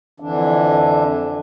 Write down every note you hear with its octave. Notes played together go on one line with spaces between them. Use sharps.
F2 D3 E3 D4